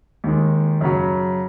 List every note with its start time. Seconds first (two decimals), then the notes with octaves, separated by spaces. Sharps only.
0.24 D#2 D#3 G#3
0.81 F#2 C#3 F#3